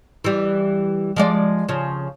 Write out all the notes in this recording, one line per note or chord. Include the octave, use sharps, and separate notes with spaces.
E3 G3
F3 G#3 D5
C#3 F3